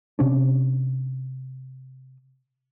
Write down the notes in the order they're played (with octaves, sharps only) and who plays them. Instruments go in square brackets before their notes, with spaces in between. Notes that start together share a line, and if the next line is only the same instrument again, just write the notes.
[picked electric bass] C3 C#4 D4